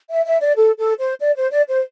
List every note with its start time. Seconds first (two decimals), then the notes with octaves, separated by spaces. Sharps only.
0.10 E5
0.26 E5
0.42 D5
0.57 A4
0.78 A4
0.99 C5
1.21 D5
1.36 C5
1.52 D5
1.68 C5